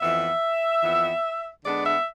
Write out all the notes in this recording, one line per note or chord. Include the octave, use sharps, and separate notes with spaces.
F2 E3 B3 E5
F2 E3 B3
D3 G#3 B3 D4 D5
E5